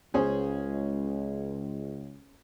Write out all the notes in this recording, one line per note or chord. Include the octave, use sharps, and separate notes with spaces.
C#2 C#4 G#4 C5